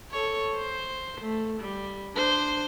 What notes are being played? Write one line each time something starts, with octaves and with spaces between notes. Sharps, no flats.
A4 C#5
C5
A3
G3
D4 C5